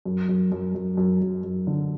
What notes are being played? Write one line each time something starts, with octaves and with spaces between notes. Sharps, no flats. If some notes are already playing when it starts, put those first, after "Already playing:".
F#2
F#2
F#2
F#2
F#2
F#2
F#2
D3